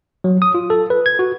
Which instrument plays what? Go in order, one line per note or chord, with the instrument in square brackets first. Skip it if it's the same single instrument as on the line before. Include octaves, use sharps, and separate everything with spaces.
[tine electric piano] F#3
D#6
F4
A4
B4
G#6
F#4